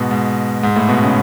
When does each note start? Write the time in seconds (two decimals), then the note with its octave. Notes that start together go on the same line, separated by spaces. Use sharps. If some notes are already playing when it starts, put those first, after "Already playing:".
Already playing: G#2 B2
0.11 G#2
0.63 G#2
0.76 A2
0.89 B2
1.03 C#3